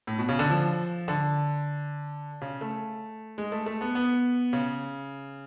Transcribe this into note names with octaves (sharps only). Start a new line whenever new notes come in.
A2
B2
C#3
D3
F3
D3
C#3
A3
G#3
A3
A3
B3
B3
C#3